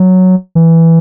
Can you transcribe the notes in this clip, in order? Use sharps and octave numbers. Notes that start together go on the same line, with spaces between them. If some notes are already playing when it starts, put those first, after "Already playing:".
Already playing: F#3
E3